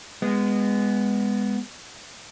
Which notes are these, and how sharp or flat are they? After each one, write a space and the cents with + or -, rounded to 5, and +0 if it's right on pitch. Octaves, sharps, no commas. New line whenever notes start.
G#3 -25 B3 +0